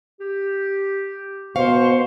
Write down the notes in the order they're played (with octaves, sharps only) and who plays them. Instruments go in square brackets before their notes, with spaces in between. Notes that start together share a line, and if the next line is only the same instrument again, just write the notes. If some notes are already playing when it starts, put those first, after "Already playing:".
[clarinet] G4
[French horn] B2 [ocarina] C5 [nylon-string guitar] F5 [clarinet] C#6